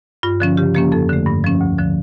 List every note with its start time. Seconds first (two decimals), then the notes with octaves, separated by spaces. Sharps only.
0.23 G2 F4
0.40 D3 F3 C#4
0.57 C#3 G4
0.75 F3 A#3 C#4 G4
0.92 F2 A4
1.09 D3 A3
1.26 G2
1.44 F3 C#4
1.61 D2
1.79 D3 F3